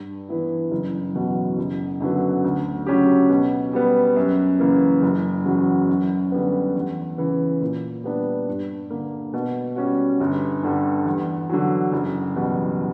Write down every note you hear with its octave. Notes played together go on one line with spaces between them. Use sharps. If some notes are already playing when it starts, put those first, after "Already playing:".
Already playing: G2
E3 B3 E4
F#1
E2 B2 F#3
F#1
F#2 D3 F#3 B3
D2
C#3 F#3 C#4 G4
B2
G3 B3
F#2
C#3 E3 A#3
F#1
E2 C#3 F#3
F#2
D3 G3 B3
E2
C#3 E3
A#2
G3 B3 D4
G2
D3 A#3
B2
G3 C#4 F#4
G1
G2 D3 G3
E2
D3 F#3
F#1
E2 B2 G3